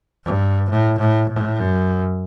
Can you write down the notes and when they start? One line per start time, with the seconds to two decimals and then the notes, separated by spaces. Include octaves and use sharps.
0.25 G2
0.70 A2
0.99 A2
1.30 A2
1.60 F#2